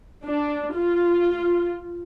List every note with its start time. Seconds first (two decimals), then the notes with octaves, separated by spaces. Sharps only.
0.25 D4
0.74 F4